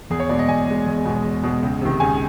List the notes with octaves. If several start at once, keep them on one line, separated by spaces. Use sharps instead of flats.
E2 G#4
C#5
B2 G#3 D5
D#5
E2 G#5
B2 G#3
E2
B2 G#3
E2
B2 G#3
C#2
C3 D#3
C#2 G#5